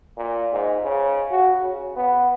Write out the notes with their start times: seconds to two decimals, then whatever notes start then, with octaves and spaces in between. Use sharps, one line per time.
0.17 A#2
0.53 G#2
0.83 C#3
1.31 F#4
1.63 C#3
1.96 B3